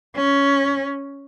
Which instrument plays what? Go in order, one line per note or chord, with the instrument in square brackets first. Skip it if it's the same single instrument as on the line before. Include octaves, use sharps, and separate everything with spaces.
[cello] C#4